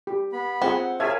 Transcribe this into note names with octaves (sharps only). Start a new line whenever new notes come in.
G4
B3 B5
C4 F4 G#4 F#5 G#5
G#4 A#4 C#5 E5 F5 G#5 A5 G#6